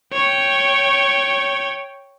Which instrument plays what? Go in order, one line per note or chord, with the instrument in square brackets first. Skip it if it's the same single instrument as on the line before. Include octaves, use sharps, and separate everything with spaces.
[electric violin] C#5 G5